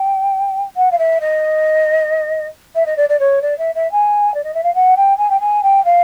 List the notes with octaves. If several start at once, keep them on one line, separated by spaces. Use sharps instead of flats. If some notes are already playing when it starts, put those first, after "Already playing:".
Already playing: G5
F#5
F5
E5
D#5
E5
D#5
D5
D5
C#5
D5
E5
E5
G#5
D5
D#5
E5
F5
F#5
G5
G#5
G5
G#5
G5
F5